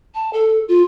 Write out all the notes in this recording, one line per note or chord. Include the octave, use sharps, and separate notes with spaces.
A5
A4
F4